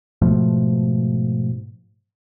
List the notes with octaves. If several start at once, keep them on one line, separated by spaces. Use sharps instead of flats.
G#2 B2 F3 A3